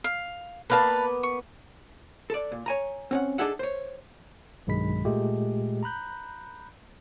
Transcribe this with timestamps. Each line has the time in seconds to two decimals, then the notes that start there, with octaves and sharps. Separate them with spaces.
0.04 F5
0.70 A#3 B3 B4 D5 F5 A5
1.23 C#6
2.30 A4 D5
2.52 A#2
2.66 C#5 G#5 A#5
3.11 C4 C#4 F#5
3.38 D4 D#4 G#4 A4 E5 F#5
3.59 C5 C#5
4.67 B1 G2 D#3 G#3 B5 B6
5.05 A#2 G#3 A3 G4
5.83 A#5 B5 F#6 G6